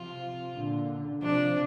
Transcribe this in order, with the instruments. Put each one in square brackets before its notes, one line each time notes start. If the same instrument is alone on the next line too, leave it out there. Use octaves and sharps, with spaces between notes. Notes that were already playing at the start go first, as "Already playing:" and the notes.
Already playing: [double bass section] C3 F3 [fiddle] F4
[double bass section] A#2 D3
[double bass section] C3 F3 [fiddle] D4